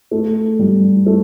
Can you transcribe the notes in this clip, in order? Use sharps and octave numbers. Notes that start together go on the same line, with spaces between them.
A3
G3
A3